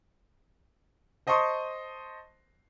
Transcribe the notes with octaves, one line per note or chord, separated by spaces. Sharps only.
C5 D#5 A5 C6 C#6 D#6